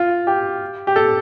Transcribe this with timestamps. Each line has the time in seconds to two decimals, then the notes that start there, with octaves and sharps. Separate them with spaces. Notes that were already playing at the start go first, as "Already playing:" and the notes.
Already playing: F4
0.27 G4
0.87 G4
0.96 A4